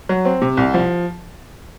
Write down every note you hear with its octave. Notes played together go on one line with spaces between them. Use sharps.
F#3
C4
C3
C2
F3